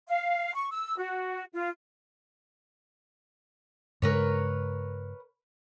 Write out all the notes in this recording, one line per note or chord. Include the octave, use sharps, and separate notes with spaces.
F5
C#6
E6
F#4
F4
G2 C#3 G#3 A#4 B4 C#5